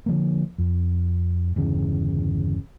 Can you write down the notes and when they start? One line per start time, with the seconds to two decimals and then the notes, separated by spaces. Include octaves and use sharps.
0.06 D3 F3 A#3
0.58 F2
1.56 G1 E2 C#3